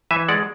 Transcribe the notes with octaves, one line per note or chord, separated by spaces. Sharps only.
E3 E5 G#5
G#3 D5 F#5